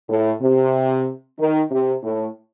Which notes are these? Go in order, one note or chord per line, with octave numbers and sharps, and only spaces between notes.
A2
C3
D#3
C3
A2